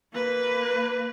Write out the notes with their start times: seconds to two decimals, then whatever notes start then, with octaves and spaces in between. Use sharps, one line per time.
0.13 A#3 B4